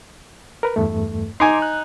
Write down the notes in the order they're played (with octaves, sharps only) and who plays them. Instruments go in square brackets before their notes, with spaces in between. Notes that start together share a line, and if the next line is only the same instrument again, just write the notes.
[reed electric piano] A#4 B4
E2 G2 A3
[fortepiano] D#4 G#5 [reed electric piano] C6 D6 G#6
[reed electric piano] F#6